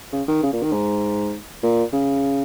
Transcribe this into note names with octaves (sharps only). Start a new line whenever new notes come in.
C#3
D#3
C#3
A#2
D#3
G#2
A#2
C#3